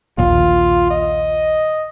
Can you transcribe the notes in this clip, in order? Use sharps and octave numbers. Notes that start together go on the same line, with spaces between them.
A#1 D#2 A#2 F4
D#5